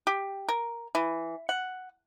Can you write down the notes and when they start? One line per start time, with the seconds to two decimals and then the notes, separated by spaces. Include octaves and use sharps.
0.07 G4
0.49 A#4
0.95 E3
1.49 F#5